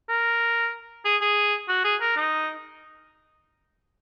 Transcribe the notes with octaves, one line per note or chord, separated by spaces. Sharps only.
A#4
G#4
G#4
F#4
G#4
A#4
D#4